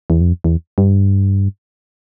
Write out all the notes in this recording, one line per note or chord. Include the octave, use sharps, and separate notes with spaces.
E2
F2
E2
G2